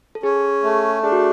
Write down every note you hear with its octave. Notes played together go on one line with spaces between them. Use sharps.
A4
C#4 G#4
A3
D4 G#4
F#4